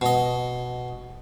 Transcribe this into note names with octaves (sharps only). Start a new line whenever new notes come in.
B2 D#5